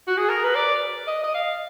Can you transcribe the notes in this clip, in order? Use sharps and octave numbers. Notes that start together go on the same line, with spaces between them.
F#4
G#4
A#4
B4
D5
D#5
D#5
F5